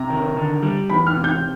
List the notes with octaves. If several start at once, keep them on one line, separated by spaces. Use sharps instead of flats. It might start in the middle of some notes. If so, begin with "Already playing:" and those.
Already playing: C3 A#5
D#3
D3
G3
E2 B5
F6
C3
G6